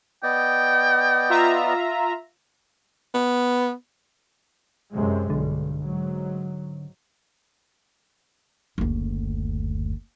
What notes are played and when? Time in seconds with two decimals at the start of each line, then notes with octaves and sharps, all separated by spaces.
0.23 B3 D5 D#5 G5
1.30 F4 E5 A#5
3.14 B3
4.92 F#2 C3 G#3
5.30 B1 G2 D3
5.82 G#2 F#3
8.78 F#1 D2